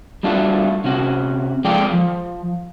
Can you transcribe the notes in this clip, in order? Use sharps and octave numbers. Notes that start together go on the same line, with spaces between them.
G3 A3 D4 F4 F#4
C3 C#4 F#4
F3 G#3 F4 A4 D5 G5
F3